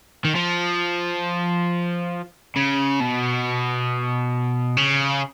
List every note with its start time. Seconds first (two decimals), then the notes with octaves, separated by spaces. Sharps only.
0.25 D#3
0.36 F3
2.56 C#3
3.00 B2
4.77 C#3